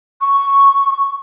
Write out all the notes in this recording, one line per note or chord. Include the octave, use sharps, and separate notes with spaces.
C#6